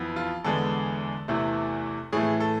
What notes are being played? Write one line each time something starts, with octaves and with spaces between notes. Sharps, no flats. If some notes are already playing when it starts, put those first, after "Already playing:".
Already playing: F2 E3 B3
F4
E2 D3 G#3 B3 A4
E2 C3 E3 A3
A2 E3 A3 G#4
A4